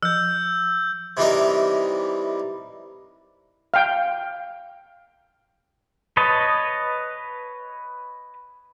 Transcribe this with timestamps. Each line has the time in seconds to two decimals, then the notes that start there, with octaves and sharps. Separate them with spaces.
0.03 F3 E6 G6
1.17 C3 E3 G3 D#4 A#4
3.74 F5 G5
6.17 B4 C#5 D#5 A5